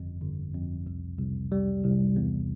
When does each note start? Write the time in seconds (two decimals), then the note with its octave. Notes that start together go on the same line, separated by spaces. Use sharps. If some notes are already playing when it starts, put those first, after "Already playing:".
Already playing: G1 F2
0.21 G1
0.54 F2
0.86 C2
1.19 C2
1.52 G3
1.84 C2
2.16 E2